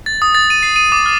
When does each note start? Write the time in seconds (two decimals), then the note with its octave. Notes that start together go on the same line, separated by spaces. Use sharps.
0.06 A6
0.22 D#6
0.35 A6
0.50 D#7
0.63 C7
0.76 D#7
0.92 D6
1.06 F6